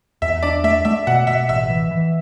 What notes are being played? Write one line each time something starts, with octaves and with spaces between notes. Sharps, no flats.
E2 E5
D4 D5
A3 E5
A3 E5
B2 F#5
B2 E5
A1 E5
E3
E3